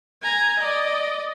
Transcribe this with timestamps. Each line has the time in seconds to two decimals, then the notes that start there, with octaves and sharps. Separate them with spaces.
0.23 G#5 A#5
0.59 D5 D#5